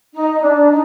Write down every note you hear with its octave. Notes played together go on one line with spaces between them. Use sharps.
D#4
D4
D#4